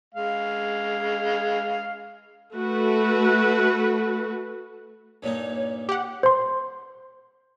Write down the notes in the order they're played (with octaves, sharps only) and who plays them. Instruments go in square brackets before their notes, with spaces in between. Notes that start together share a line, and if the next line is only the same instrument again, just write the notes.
[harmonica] G#3 F5
[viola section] A3 F#4 B4
[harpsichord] G2 A#2 D#4 [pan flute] C#5
[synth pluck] G4 F#5
[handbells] C5 C6